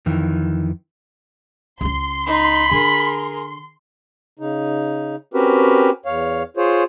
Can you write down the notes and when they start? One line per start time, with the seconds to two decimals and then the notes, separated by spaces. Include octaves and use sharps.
0.06 F2 D#3 E3
1.81 C#2 C#4 C6
2.27 D#4 B5
2.71 D3 G#4 A#4
4.39 C#3 D#4
5.34 C4 C#4 F#4 G4 A#4 B4
6.05 E2 C#5 F5
6.57 F4 G#4 C5 C#5